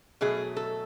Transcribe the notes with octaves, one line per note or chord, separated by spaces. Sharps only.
B2 F#3 A3 G#4
A4